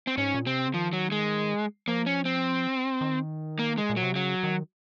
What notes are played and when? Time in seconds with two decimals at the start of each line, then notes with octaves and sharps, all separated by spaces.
0.07 C4
0.18 G#2 C#4
0.35 A#2
0.46 C3 C4
0.67 C#3
0.74 D#3 F3
0.93 F#3
1.12 G#3
1.88 F3 A#3
2.06 C#4
2.25 C4
3.01 D#3
3.59 A#3
3.78 G#3
3.90 A#2
3.97 F#3
4.03 C3
4.15 C#3 F#3
4.43 D#3